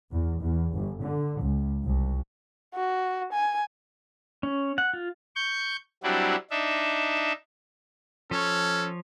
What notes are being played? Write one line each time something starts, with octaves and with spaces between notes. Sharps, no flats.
E2
E2
G1
D3
C#2
C2
F#4
G#5
C#4
F#5
F4
C#6 G6
F#3 G3 C4 D4 E4 F#4
D4 D#4 E5
F3 C#4 A4 C#5